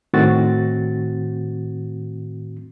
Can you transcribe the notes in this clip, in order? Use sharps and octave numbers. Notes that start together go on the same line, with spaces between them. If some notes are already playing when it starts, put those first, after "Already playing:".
A2 D#3 C4 F#4 A6